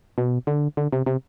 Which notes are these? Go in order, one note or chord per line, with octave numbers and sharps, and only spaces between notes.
B2
D3
D3
C3
C3